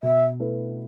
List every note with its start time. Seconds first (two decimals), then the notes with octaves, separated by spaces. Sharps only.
0.03 B2 E5
0.40 A3 E4 B4